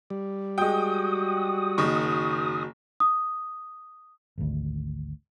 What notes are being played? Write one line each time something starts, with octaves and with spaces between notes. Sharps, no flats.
G3
G#3 F#4 G5 D#6
F#1 D#3 C#6
D#6
G#1 D2